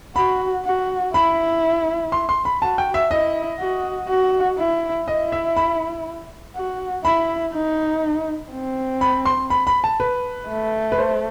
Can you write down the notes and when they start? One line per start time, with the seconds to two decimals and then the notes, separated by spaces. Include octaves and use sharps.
0.16 F#4 B5
0.65 F#4
1.14 E4 B5
2.12 C6
2.29 C6
2.45 B5
2.61 F#4 A5
2.78 G5
2.94 E5
3.11 E4 D#5
3.59 F#4
4.09 F#4
4.59 E4
5.07 E4 D#5
5.32 E5
5.57 B5
6.56 F#4
7.05 E4 B5
7.54 D#4
8.52 C4
9.01 B5
9.25 C6
9.50 B5
9.67 B5
9.84 A5
10.00 B4
10.49 A3
10.92 B4
10.98 C5